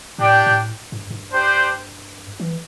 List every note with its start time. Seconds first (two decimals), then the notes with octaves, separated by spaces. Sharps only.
0.18 A2 D4 G4 D5 G5
0.46 A2
0.92 G2
1.10 G2
1.29 D4 G4 C5
2.40 E3